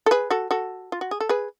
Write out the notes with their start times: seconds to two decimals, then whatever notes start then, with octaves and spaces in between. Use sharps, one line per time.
0.06 A4
0.11 G#4 B4
0.30 F#4 A4
0.51 F#4 A4
0.92 F4
1.01 F#4
1.11 G#4
1.20 A4
1.29 G#4 B4